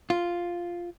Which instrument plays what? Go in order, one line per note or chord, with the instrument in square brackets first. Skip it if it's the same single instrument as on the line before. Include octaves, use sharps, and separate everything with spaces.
[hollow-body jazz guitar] F4